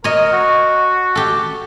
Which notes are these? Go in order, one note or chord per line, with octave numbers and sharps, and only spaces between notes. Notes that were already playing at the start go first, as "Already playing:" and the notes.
A#4 C#5 D#5
F#4
G4 A4